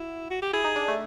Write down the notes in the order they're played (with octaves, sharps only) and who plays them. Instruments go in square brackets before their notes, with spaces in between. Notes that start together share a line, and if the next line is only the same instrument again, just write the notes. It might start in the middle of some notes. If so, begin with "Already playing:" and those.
Already playing: [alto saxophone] E4 [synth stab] F#4
[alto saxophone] F#4
G4
[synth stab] E4 [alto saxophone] G#4
[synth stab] D#4
D4
A3